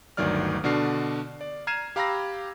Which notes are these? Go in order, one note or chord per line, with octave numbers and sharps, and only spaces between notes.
G1 D2 D#3 F#3 D5 F6
B2 D3 D4 F#4 F6 C7
D5
A#5 F6 G#6 C7 D#7 E7
G4 F5 A#5 B5 E6 A#6